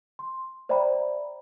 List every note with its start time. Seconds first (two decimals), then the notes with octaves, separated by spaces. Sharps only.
0.19 C6
0.69 C5 D5 E5 G5 A#5 B5